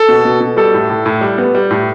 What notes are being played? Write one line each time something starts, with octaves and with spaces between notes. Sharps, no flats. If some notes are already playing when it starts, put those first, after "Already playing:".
Already playing: A4
B2
B2
B2
G3 A4
A2
A2
A2
G3
B3
G3
A2